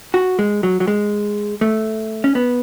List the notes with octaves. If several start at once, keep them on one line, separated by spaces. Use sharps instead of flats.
F#4
G#3
F#3
F#3
G#3
A3
C#4
B3